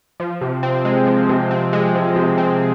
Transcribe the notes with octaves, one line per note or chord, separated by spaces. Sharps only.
F3
C3
C4
G#3
F3
C3
C4
G#3
F3
C3
C4